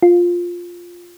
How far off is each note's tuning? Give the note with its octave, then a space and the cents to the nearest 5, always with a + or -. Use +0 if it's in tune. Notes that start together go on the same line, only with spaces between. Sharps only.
F4 +5